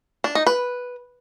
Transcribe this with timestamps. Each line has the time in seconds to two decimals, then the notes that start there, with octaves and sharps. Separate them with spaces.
0.24 D4
0.35 D#4
0.47 B4